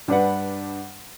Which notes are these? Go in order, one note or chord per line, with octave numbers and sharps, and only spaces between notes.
G2 D4 B4 F#5